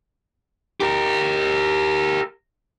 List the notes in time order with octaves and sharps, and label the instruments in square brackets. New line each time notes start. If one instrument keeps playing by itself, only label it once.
[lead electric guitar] G4 A#4